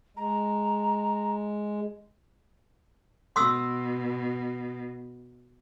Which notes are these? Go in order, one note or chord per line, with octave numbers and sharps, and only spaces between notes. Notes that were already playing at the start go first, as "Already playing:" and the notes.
G#3 A#5
B2 C6 D#6 E6